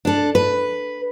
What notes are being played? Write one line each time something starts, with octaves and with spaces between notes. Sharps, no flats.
D4 A4
B4